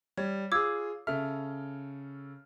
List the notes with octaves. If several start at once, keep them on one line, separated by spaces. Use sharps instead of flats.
G3 C#5
F4 G#4 D6 E6 G#6
C#3 A4 E5 F6